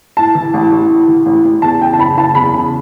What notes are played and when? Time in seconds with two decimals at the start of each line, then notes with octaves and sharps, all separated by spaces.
0.17 A2 A5
0.35 E3
0.54 A1
0.71 A1
0.91 A2
1.08 E3
1.26 A1
1.44 A1
1.62 E2 A5
1.81 C#3 G5
1.93 A5
1.99 F#1 B5
2.18 F#1 A5
2.35 E2 B5
2.54 C#3